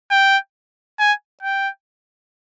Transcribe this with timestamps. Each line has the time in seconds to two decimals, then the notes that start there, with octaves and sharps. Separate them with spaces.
0.11 G5
0.99 G#5
1.43 G5